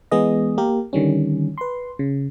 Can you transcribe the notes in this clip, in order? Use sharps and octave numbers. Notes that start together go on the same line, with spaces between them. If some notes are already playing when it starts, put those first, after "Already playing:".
E3 G#3 B3 G#4 D#5
A#3 G4 A#4
D3 D#3 G3 C#4
B4 C6
C#3